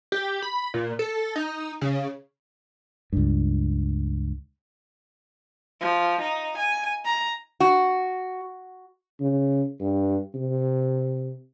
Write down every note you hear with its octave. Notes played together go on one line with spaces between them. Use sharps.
G4
B5
A#2
A4
D#4
C#3
C#2 G2
F3
D#4
G#5
A#5
F#4
C#3
G2
C3